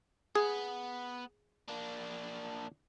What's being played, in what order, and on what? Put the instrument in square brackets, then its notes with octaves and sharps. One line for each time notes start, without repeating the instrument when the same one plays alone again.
[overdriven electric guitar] B3 [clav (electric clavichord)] G#4
[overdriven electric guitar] A#3 D4